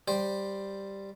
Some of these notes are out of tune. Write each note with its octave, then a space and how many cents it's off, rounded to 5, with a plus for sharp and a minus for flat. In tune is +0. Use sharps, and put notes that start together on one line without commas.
G3 +0 C5 +0 G5 +0